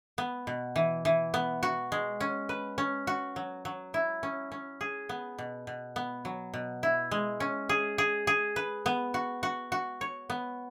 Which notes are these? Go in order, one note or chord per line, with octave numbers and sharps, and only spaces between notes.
B3
B2
E3
E3
B3
F#4
G#3
C#4
B4
C#4
F#4
F#3
F#3
E4
C#4
C#4
G#4
B3
B2
B2
B3
F#3
B2
E4
G#3
C#4
G#4
G#4
G#4
B4
B3
F#4
F#4
F#4
C#5
B3